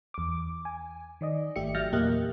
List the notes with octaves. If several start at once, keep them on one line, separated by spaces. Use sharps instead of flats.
E2 D6
G#5
D#3 D5 D#5
G#1 A3 G4 E5 C#7
F#3 E5 F6 G6 A6 A#6
E2 A#2 A#3 G4 D#5 F#6